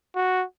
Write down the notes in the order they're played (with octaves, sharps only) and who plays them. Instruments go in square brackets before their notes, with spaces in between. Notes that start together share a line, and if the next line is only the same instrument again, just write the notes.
[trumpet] F#4